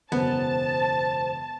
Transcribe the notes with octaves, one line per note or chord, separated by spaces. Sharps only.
E1 F#2 C#3 B3 C5 A5